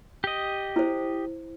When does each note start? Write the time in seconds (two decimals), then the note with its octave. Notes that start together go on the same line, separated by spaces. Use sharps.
0.24 G4 D#5
0.76 E4 C5